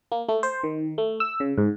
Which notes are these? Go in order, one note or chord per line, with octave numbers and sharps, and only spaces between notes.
A#3
A3
C5
D#3
A3
E6
C#3
G#2